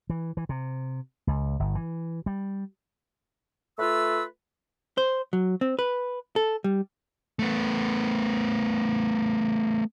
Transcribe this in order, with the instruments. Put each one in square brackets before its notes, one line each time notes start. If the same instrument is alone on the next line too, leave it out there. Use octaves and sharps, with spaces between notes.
[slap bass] E3
E3
C3
C#2
G1
E3
G3
[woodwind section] A3 F4 B4 E6
[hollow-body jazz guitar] C5
F#3
C4
B4
A4
G3
[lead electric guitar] A3 B3